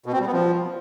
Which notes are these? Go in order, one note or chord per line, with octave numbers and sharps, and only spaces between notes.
B2
C4
G3
B3
F3